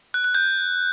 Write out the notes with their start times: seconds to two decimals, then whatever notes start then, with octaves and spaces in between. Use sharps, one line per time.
0.14 F#6
0.24 F#6
0.35 G6